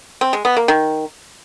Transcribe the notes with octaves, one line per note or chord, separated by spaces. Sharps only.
C4
G#3
B3
A#3
D#3